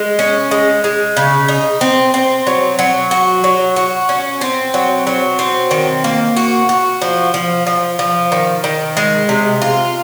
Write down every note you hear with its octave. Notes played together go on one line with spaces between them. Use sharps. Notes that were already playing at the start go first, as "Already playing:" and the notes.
Already playing: G#3
C#4
G#3
G#3
C#3
D#4
C4
C4
F#3
F#3
F#4
F#3
F#4
C#4
C4
F#3
F#3
C4
D#3
A#3
F#4
F#4
F3
F3
F3
F3
D#3
D#3
G#3
C3
F4